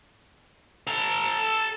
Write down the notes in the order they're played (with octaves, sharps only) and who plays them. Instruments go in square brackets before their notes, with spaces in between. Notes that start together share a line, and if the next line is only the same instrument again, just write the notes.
[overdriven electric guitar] A4 A#5